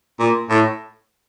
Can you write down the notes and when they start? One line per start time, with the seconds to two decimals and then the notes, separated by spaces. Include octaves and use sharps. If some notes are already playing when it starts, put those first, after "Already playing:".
0.19 A#2
0.50 A2